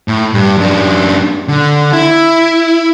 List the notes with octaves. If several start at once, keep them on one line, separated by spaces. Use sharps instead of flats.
A2
G2
F#2 D4
D3
E4